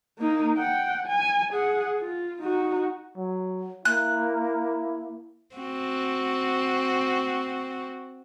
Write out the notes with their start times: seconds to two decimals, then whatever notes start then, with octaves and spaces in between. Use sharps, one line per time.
0.19 A#3 D#4
0.57 F#5 G5
1.07 G#5
1.53 G#4 F#5
1.99 F4
2.42 D#4 F#4
3.17 F#3
3.85 A#3 E4 F#6
5.56 C4 F#4